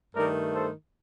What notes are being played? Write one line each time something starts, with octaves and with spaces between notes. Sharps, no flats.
G2 D#3 A3 A#4 D5
A4 C5